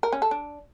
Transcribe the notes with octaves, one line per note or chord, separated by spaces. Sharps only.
A#4
C#4
A4
D4